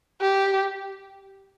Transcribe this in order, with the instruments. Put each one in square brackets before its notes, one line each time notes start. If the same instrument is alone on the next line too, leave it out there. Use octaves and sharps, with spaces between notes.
[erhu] G4